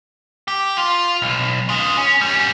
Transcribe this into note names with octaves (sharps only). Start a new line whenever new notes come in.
G4
F4
B1
F4 G#4
C#4
G3 C#4